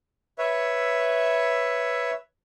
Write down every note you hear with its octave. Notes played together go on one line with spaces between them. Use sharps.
B4 C#5 E5